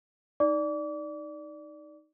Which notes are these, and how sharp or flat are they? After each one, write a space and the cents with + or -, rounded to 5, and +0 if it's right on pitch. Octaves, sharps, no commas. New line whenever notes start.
D#4 +0 D5 +0 D6 -35